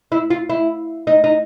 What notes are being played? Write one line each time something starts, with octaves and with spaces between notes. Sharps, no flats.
E4
F4
E4
D#4
D#4